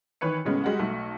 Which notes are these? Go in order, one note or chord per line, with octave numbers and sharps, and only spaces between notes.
D#3 E3 B4 C#5 C#7
A2 C#3 G#3 B3 C#4
G3 G#3 F#4 F#5
B1 A3